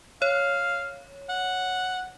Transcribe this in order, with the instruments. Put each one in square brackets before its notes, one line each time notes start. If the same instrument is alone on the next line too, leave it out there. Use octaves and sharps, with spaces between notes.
[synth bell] C#5 [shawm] F5
[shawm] F#5